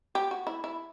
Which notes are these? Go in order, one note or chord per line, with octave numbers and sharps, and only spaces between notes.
G4
F#4
E4
E4